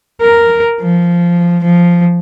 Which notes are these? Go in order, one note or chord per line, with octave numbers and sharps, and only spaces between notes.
A#4
F3
F3